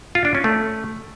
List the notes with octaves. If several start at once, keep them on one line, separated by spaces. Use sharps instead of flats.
F4
D4
C#4
A3